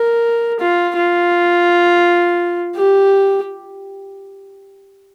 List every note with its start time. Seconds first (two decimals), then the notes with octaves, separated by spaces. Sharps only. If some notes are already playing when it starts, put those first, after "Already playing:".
Already playing: A#4
0.60 F4
0.96 F4
2.77 G4